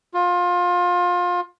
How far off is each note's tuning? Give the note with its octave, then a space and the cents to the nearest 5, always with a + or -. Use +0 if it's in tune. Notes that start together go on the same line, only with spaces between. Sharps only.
F4 +25